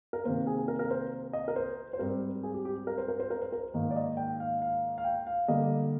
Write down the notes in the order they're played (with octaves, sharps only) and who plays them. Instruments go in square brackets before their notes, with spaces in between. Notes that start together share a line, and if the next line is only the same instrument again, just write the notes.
[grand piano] A#4
C3 D#3 A#3 C5
G#4
A#4
A#4
C5
D#5
A#4
C5
C5
G#2 G3 C4 A#4
G#4
G4
G4
A#4
C5
A#4
C5
A#4
C5
A#4
G#2 D#3 A#3 D#4
D5
D#5
G5
F5
F5
F5
G5
F5
D3 G3 A#3 D#5